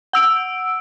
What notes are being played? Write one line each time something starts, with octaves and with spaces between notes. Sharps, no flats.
F#5 E6 D7